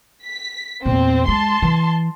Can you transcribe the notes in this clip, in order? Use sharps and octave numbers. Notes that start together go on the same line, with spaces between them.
B6
E2 A#2 C4
G#3 A5 C6
E3